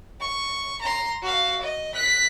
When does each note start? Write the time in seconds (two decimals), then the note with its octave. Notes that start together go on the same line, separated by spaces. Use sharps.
0.21 C#6
0.81 A#5 C6
1.22 F#4 F5
1.61 D#5
1.95 F#6 B6